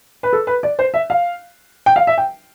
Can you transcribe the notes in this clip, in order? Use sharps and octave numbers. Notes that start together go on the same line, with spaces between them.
B4
A4
B4
D5
C5
E5
F5
G5
F5
E5
G5